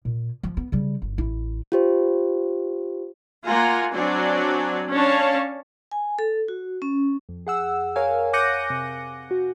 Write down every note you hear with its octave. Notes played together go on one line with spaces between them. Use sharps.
A#2
F3
B3
C#3 G3
G1
A1 E4
F4 G4 C5
A#3 F4 F#5 G#5 A#5
F#3 C4 D4 F#4 D5 G#5
C#4 D4 C#5 F5 A5
G#5
A4
F#4
C#4
F2
G#4 F#5 E6
A#4 C#5 F5 G#5
D6 F#6 G6 A#6 C#7 D#7
C3
F#4